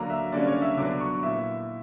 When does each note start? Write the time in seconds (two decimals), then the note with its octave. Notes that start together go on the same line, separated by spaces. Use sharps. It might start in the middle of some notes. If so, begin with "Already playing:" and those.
Already playing: D3 F#3 A#3 D4 A#5
0.10 E5
0.32 D3 G3 A#3 C#4 D5
0.47 C#5
0.62 E5
0.77 D3 F#3 B3 D4 D6
1.00 C#6
1.22 A#2 A#3 E4 E5